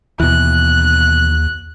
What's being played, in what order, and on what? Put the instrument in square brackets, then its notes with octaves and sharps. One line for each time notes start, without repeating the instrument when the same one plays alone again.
[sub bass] D#2 [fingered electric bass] B2 E3 [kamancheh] F#6